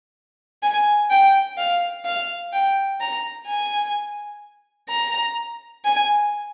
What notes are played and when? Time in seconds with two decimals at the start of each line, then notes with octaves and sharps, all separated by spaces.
0.63 G#5
1.10 G5
1.58 F5
2.05 F5
2.53 G5
3.01 A#5
3.47 G#5
4.89 A#5
5.85 G#5